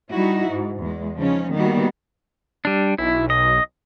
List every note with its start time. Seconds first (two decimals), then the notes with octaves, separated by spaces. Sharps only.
0.12 G3 D#4 E4 F#4
0.49 G#2
0.81 E2 G#3
1.18 C#3 F3 C#4 D#4
1.52 D#3 G3 A#3 B3 F#4
2.65 G3 D4
2.98 B1 E4
3.30 D#5